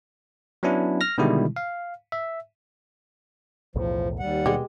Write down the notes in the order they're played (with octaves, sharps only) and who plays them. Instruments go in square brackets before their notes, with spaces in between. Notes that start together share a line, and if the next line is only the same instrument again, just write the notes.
[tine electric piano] F#3 B3 C#4 D4 E4
F6 A#6
B2 D3 D#3 G3 G#3 E4
F5
E5
[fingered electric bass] B1 E2 A2 [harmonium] F3
[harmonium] D#2 G3 F#5
[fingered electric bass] B2 [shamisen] G#3 G4